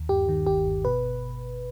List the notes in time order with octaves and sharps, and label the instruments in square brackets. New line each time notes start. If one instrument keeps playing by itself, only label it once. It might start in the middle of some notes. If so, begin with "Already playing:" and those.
Already playing: [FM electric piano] D#2
G2 G4
D#3
G1 G4
G1
B2 B4